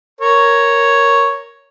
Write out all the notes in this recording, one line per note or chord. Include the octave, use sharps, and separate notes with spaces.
A#4 C#5